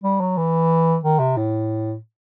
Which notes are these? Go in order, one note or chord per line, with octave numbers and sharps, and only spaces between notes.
G3
F#3
E3
D#3
C3
A2